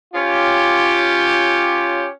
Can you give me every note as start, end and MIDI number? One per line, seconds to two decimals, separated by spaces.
0.14 2.08 61
0.14 2.08 65
0.14 2.08 67